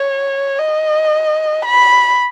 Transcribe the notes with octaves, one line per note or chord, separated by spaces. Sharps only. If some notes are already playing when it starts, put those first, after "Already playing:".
Already playing: C#5
D#5
B5